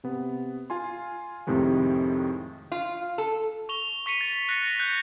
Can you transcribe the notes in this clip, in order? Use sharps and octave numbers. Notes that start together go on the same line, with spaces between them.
C3 B3
F4 G#5 C6
F2 A2 C3 D#3 G#3
F4
A4
C#6 F7 G7
C#6 B6 C#7 D#7 F7
A6
F#6 A#6 C#7
F#6 G6